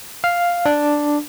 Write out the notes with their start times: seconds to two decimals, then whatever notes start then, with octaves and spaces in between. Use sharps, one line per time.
0.24 F5
0.66 D4